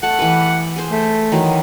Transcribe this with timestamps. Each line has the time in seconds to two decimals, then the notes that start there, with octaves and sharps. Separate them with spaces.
0.03 A3 F#5 A5
0.19 E3 G4 B4
0.76 G#4 C5
0.91 A3
1.32 D#3 E3 F#3